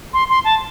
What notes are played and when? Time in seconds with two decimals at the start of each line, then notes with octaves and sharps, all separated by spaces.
0.13 C6
0.29 C6
0.44 A5